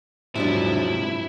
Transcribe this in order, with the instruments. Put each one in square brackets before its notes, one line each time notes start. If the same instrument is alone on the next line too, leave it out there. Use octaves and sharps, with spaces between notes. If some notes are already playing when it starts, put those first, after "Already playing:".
[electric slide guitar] G#2 F#3 [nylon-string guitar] C3 F3 D4 [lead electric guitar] E4